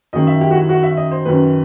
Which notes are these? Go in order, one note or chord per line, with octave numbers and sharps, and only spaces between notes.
F#2 D#3 D#5
E5
G4
F#4
E4
F#4
E5
D#5
C5
F#2 D#3 B4